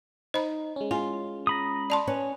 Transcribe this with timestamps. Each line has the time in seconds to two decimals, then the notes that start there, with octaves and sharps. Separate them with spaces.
0.34 D#4 C5 B5
0.76 G#3 C#4
0.91 F4 G#5
1.47 A#5 B5 D#6
1.90 D5 A5 C6
2.07 C#4 B4 C#5